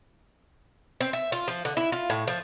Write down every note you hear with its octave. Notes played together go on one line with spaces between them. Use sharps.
C4
E5
F4
F3
D3
E4
F4
A2
F3